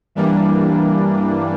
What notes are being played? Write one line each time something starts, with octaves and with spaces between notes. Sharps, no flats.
G2 E3 G3 A#3 D4